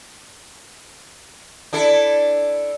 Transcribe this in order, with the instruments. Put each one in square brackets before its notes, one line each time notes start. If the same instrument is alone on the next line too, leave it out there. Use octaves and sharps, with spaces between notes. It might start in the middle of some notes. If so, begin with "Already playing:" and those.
[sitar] D4 E4 A4